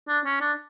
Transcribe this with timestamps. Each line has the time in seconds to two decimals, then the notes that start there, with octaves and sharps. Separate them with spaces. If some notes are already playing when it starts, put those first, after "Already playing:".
0.08 D4
0.25 C#4
0.41 D4